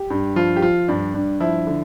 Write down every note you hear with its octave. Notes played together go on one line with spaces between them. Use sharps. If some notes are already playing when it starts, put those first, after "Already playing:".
Already playing: G4
G2
F3 F4
G4
F3 F4
G2 D4
G2
F3 E4
D3